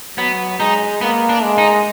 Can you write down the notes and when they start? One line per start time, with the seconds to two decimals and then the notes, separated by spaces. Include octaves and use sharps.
0.17 F#3 B3
0.59 G#3 D#4
1.01 A#3 B3
1.29 D4
1.43 G#3
1.58 D#4